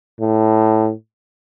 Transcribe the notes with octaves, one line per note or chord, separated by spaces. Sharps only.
A2